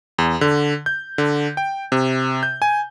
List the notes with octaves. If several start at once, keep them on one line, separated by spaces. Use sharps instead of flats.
E2
D3
G6
D3
G5
C3
G6
G#5